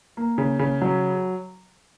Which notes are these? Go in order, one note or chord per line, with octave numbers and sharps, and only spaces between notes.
A#3
C#3
C#3
F#3